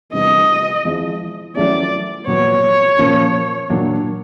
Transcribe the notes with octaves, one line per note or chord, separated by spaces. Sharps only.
C3 E3 G3 B3 D4 D#5
F3 G#3 C4 E4
F#3 A3 C#4 E4 D5
A#2 F#3 B3 C#5
A#2 F3 A#3 C#4
A#2 F#3 A#3 D4